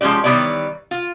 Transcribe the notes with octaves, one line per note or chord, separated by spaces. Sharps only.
F3 G#3 A3 C#4 G4 D5
D#3 E3 G3 B3 C#5 D5
F4